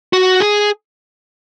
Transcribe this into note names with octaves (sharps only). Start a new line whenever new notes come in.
F#4
G#4